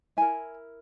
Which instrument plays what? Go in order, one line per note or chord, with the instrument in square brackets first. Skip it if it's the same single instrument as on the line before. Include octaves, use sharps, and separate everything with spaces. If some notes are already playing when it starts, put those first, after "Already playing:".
[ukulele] E4 A#4 G#5